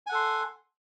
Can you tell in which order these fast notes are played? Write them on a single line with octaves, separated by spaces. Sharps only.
G#5 F#5 A4 C6